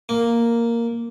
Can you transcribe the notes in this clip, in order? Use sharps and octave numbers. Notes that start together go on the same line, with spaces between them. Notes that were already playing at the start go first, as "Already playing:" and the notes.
A#3